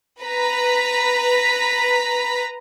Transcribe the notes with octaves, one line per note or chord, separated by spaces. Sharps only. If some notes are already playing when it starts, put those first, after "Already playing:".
B4 A#5 B6